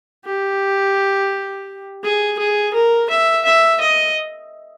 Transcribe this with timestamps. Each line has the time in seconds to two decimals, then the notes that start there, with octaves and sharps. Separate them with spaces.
0.25 G4
2.03 G#4
2.39 G#4
2.74 A#4
3.10 E5
3.45 E5
3.80 D#5